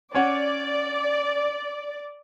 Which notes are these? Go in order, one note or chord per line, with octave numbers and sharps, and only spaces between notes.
C#4 C#5 D5 F#5